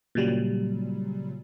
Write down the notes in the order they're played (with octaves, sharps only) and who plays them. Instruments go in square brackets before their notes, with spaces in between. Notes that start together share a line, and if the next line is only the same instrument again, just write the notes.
[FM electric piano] A#2 C#3 F#3 G3